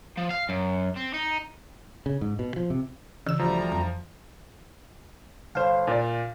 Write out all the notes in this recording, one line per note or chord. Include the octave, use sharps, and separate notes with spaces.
F3
F5
F#2
C4
D#4
C#3
G#2
B2
F3
C3
C#3 E3 E6
D2 F3 G3 A#5
F2
G1 C5 F5
A#2 D5